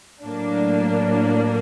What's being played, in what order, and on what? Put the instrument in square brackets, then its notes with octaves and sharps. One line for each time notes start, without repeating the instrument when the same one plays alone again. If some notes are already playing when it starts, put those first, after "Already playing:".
[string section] A2 F#3 A#3 D4